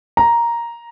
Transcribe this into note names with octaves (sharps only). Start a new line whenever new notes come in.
A#5